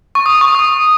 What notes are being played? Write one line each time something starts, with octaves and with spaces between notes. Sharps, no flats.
C#6
D#6
C#6
D#6